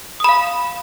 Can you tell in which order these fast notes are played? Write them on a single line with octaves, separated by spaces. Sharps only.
D#6 B5 F5